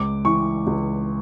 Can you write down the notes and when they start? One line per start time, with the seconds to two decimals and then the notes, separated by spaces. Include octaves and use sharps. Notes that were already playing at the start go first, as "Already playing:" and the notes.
Already playing: C#2 D6
0.25 E3 C#6
0.67 C#2